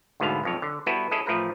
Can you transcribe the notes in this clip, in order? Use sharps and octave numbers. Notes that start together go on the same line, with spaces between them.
D2 G#2 B2 D3 B3 F5
B1 F2 C#5
D3
G3 B3 E4 F#4 A4 B4
C#4 E4 G#4 A4 D#5
A1 F3 A3 A#4 B4 A#5